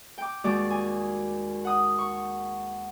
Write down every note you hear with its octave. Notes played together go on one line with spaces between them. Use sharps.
G5 D6
D#2 G#3 F#4 D5
G#5
F#5 D#6
C#6